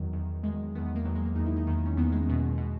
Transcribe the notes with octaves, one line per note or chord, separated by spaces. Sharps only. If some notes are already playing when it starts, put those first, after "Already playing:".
Already playing: E2 D#3 F#3
E2 D#3
E2 D#3 G#3
E2 D#3 B3
B3
A#3
E2 D#3 F#3
G#3
A#3
E2 D#3 D#4
E4
D#4
E2 D#3
C#4
E2 D#3 B3
G#3
E2 B2
B2